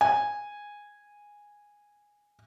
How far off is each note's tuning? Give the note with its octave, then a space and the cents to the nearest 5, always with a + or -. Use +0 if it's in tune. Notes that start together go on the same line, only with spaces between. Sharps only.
G#5 -10